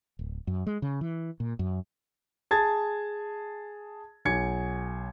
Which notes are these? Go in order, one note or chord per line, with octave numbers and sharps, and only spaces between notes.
D1
F#2
G#3
C#3
E3
A#2
F#2
G#4 A5 G#6 A6
B1 G#5 G#6 C#7